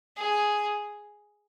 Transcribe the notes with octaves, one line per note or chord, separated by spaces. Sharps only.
G#4